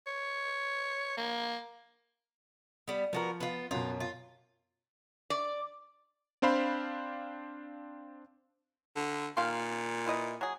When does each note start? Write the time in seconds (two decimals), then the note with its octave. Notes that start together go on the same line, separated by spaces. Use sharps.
0.07 C#5
1.17 A#3
2.88 G3 B3
3.13 F3 B3 F#4 A#4
3.40 B3 F4
3.71 F#2 B2 F4
4.00 F4
5.30 D5
6.42 C4 D4 C5 F5 B5
8.96 D3
9.37 A#2 D#3 F5 C6
10.06 E4 B4 D#5
10.41 F#3 G#4